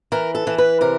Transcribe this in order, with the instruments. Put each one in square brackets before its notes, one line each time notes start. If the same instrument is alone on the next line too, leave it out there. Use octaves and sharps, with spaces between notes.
[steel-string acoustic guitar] E3 A#4
A4
E3
B4
C3 A#4